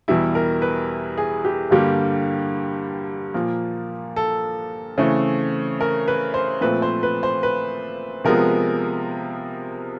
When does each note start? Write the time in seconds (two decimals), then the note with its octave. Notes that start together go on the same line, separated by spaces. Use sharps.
0.08 E2 B2 G3 E4
0.35 A#4
0.62 B4
1.17 G#4
1.45 G4
1.71 G2 D3 G3 A#3 G4
3.34 A#2 F3 A#3
4.16 A4
4.98 C#3 E3 A3 C4
5.81 A#4
6.08 B4
6.34 C5
6.61 A#2 F3 A3 C4 B4
6.82 C5
7.03 B4
7.23 C5
7.43 B4
8.25 C3 F3 G#3 B3 A#4